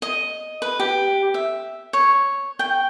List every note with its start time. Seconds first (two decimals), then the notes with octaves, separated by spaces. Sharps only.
0.02 D#5
0.62 B4
0.80 G4
1.34 E5
1.93 C#5
2.59 G5